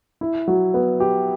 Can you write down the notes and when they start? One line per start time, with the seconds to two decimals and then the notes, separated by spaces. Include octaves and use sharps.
0.21 E4
0.48 F#3
0.74 B3
1.00 G4